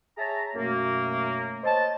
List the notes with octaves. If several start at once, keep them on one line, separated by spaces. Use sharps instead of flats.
G#4 C#5 E5 A5 A#5
F#2 B2 A3 A#3
C5 C#5 D#5 A5